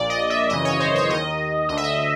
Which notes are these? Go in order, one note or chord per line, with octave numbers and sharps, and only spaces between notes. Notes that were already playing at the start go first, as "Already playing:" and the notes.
Already playing: A#1 A#2 D5
D#5
E5
G#1 F#2 C#3 E3 D#5
C#5
C5
C#5
D#2 D#3 D#5
D2 D3 D#5
E5
D#5